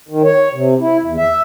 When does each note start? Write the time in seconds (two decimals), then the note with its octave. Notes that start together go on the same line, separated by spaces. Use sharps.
0.09 D#3
0.23 C#5
0.54 C3
0.80 E4
1.04 E2
1.17 E5